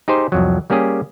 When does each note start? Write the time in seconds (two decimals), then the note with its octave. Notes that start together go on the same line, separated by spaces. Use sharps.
0.08 D#4 G4 G#4 C5
0.32 C2 F2 F#3
0.70 G3 A#3 C#4 G4 G#4